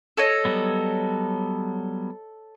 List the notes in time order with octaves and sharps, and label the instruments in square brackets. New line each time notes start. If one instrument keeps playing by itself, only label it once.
[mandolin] A4 C#5 D#5
[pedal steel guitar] F#3 G3 B3